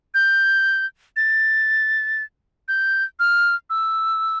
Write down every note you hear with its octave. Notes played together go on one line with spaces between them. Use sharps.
G6
A6
G6
F6
E6